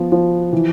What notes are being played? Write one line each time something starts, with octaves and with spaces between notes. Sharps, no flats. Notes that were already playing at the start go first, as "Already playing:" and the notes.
Already playing: F3 B3
F3
E3